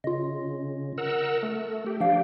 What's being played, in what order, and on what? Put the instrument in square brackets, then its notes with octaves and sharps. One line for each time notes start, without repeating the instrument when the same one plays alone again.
[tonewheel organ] C#3 [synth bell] F4 D#5
[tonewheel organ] A#4 F#5 E6
A3
G4
[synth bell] F3 F5 [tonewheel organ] D4 G4